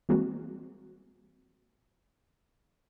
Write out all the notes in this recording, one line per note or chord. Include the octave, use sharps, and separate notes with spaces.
E3 G3 G#3 A#3 C4 F#4